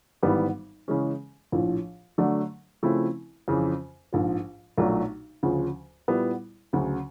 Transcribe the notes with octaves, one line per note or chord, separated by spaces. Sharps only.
G#1 G#2 E3 G3 B3
C#3 E3 G#3 C#4
A#1 A2 F3
D3 F#3 A3 D4
C#3 F3 A3 C4 E4
F2 C#3 E3
A#1 G#2 F3
B1 A#2 F#3 A3 D4
D2 C#3 F3
A#2 G3 B3 E4
D2 C#3 F#3